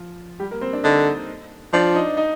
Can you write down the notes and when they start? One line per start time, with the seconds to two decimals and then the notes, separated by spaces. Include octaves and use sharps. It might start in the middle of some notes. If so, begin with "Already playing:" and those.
Already playing: F3 F4
0.40 G3 G4
0.51 A#3 A#4
0.61 C4 C5
0.73 D4 D5
0.84 D3 D#4 D#5
1.73 F3 D4 D5
1.95 D#4 D#5
2.17 D#4 D#5